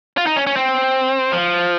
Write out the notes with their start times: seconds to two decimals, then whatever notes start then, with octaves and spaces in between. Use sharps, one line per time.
0.18 F4
0.26 D#4
0.36 C#4
0.47 C#4
0.56 C4
1.32 F3